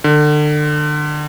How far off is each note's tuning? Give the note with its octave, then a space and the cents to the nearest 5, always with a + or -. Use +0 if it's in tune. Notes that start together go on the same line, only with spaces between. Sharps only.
D3 +30